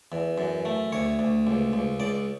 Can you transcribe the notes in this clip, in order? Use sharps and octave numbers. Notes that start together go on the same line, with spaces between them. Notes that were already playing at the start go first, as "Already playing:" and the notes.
E2
F#2
A3
D2 C#5
D2
C#2
C#2
C#2 D5